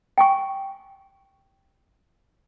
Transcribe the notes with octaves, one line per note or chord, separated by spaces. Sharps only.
G5 G#5 C#6